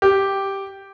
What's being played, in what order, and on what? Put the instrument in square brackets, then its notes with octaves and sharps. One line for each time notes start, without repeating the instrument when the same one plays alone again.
[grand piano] G4